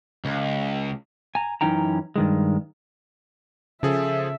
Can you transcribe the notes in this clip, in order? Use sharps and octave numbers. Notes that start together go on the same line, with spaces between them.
C#2
G#5 A#5
F#2 E3 C#4 D#4 G5 A#5
G2 D#3 G#3
C#3 F3 G#4 A4 E5